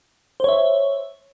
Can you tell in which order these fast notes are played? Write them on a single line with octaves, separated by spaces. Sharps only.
C5 C#5 E5